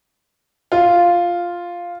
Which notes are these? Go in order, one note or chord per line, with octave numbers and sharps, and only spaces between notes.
F4